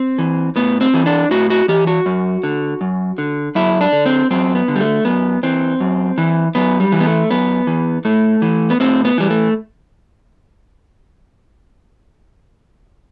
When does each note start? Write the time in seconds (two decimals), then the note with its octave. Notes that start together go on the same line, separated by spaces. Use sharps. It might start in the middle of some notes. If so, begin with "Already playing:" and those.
Already playing: C4
0.18 E3
0.56 A2 B3
0.81 C4
0.94 E3
1.06 D4
1.31 A2 F#4
1.50 F#4
1.68 E3 G4
1.87 F#4
2.06 F#2
2.43 D3
2.81 F#2
3.18 D3
3.55 F#2 E4
3.81 D4
3.93 D3
4.06 C4
4.31 F#2 C4
4.55 B3
4.68 D3
4.76 G3
4.81 A3
5.05 F#2 B3
5.43 E3 C4
5.80 F#2
6.18 E3
6.55 F#2 B3
6.80 G3
6.92 E3
7.00 B3
7.06 A3
7.30 F#2 B3
7.67 E3
8.05 A2 A3
8.42 E3
8.70 B3
8.80 A2 C4
9.05 B3
9.18 E3 G3
9.30 A3